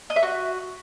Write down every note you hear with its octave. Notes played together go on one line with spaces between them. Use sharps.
D#5
E5
F#4